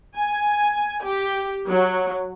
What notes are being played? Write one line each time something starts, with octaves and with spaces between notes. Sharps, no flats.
G#5
G4
F#3